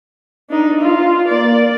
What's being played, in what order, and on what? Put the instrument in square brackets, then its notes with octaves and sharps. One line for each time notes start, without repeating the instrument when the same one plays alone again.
[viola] D4 D#4
F4
A#3 D5